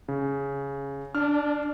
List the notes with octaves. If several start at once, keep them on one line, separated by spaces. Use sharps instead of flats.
C#3
D4 F6